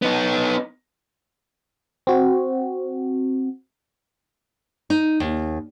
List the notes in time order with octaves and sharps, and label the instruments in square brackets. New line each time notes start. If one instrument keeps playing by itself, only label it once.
[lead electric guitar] B3 D#4
[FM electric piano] C4 F#4
[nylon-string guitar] D#4
D#2